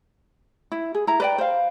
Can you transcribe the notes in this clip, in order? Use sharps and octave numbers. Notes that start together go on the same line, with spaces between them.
E4
G#4
E4 A#5
B4 D5 G5
C5 F5